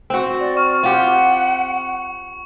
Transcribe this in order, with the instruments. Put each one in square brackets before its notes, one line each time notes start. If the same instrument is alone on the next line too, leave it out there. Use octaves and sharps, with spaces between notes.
[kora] C4 F#4
[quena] D5
[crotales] C#6 [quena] F6
[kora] F4 G4 [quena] F#5